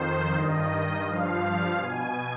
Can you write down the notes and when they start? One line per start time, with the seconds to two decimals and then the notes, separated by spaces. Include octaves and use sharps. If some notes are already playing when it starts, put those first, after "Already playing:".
Already playing: F2 D#3 C5
0.33 G2 D#3 D#5
1.06 G2 F3 F5
1.78 B2 G#5